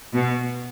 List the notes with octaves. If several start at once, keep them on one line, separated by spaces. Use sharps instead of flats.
B2